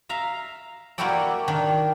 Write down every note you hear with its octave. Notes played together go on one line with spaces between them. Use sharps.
E5 F5 A#5
A#3 E4 F#4 G4 A4 D5
D#3 D4